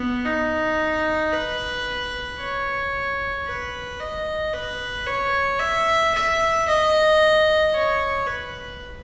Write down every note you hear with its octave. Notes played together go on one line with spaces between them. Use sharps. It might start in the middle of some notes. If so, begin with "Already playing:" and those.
Already playing: B3
D#4
B4
C#5
B4
D#5
B4
C#5
E5
E5
D#5
C#5
B4